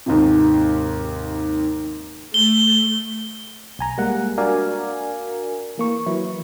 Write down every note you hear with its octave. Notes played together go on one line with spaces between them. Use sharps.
D#2 G#2 C3
A3 G7
B1 G#5 A#5
G3 G#3 A#3 F#5
D4 F#4 A#4 D5 F5 G#5
E3 A#3 C#6
E3 F#3 E4